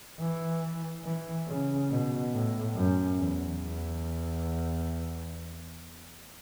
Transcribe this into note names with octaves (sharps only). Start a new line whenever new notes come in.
E3
E3
C#3
B2
A2
F#2
E2
E2